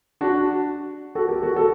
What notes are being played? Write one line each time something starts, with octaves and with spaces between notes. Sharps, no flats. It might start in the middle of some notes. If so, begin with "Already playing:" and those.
D4 F#4
F#4 A4
G4 A#4
F#4 A4
F#4 A4